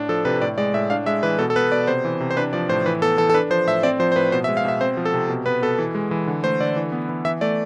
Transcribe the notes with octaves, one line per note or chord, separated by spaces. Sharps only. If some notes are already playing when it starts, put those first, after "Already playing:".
Already playing: A2 D4
F3 A4
C3 B4
A2 D5
G#3 D5
A2 E5
D4 F5
G#3 E5
E3 B4
B2 A4
A4
B3 B4
B2 D5
C3 C5
E3
C3
C5
D4 B4
F3 D5
A2 C5
E3 B4
B3 A4
E3 A4
A4
D4 B4
F3 C5
A2 E5
C4 D5
F3 C5
C5
A2 B4
B2 C5
E5
G#3
F5
B2 E5
C4 C5
F3
A4
C3
B2
B3 B4
B2 A4
E3
G#3
E3
D3
A3 C5
D3 D5
E3
B3
E3
E3 E5
A3 D5